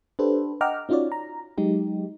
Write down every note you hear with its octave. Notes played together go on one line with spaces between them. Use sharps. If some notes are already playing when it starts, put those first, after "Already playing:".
D4 G4 A4 B4 C5
D#5 F#5 G5 A#5 D6 F6
C#4 D#4 F4 F#4 C#5 D5
A#5
F#3 G#3 D#4 G4